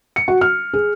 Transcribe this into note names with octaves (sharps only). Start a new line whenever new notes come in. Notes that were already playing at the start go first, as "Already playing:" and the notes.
C#7
F#4
F6
G#4